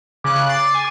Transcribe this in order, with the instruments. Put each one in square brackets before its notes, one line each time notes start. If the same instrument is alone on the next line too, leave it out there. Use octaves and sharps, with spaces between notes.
[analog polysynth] C#3 F#6 [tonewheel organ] D6
[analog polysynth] A6 C7
G#5